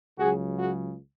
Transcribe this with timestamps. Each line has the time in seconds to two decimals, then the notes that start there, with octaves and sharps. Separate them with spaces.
0.18 C#2 C#3 F#3 F#4 G#4
0.58 F#4 G#4